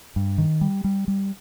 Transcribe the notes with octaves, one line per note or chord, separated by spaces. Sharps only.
G2
D#3
G3
G3
G3